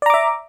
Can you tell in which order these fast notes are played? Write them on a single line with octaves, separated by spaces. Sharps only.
D5 A#5 D6 E5